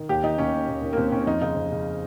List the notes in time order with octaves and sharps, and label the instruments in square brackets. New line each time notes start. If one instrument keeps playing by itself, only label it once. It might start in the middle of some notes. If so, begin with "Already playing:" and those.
Already playing: [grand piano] D#3
D#2 G4
D#3 D#4
D#2 C#4
D#3
D#2
D#3
A#3
D#2 C4
D#3 C#4
F2 D#4
C#3 D#4
F2
C#3